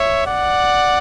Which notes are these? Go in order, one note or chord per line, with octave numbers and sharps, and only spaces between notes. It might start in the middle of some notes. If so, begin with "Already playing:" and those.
Already playing: C#5 E5
D5 F#5